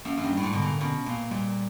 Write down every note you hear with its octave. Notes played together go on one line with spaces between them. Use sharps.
F#2 A#3
F#2
G2
G3
A2
G#2
B2 D3
A#2
B2 C#4
A#2 A#3
A#2 G3